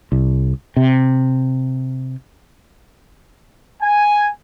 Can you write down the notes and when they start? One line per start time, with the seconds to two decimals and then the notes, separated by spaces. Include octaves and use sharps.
0.12 C2
0.76 C3
3.82 G#5